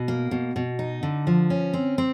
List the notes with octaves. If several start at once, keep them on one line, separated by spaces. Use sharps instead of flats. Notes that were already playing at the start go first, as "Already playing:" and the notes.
Already playing: B2
A#3
B2
B2
D#4
D3
F3
C#4
C4
C4